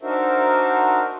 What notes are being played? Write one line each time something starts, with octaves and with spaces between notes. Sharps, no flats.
D4 D#4 F#4 A#4 C5 E5